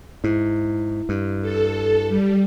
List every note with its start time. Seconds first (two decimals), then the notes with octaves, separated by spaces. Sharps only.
0.24 G#2 E4
1.09 G2
1.42 A4
2.08 G3